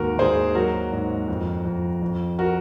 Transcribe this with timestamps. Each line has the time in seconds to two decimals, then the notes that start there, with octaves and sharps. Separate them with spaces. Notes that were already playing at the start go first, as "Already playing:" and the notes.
Already playing: D#2 G#2 F#4 A#4
0.18 D#2 G#4 C5
0.55 F#3 F#4 A#4
0.92 G#2
1.28 F2
1.65 F2
2.02 F2
2.38 F#4 A#4